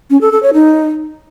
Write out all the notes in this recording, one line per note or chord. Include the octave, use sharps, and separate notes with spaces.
C#4
A4
A4
C#5
D#4